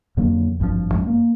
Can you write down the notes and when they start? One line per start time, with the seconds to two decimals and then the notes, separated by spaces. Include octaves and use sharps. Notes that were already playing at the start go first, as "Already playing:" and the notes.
0.17 F2 D3 F#3 A#3
0.60 G#1 G2 C3 F3
0.94 F#2 G#3
1.07 A#3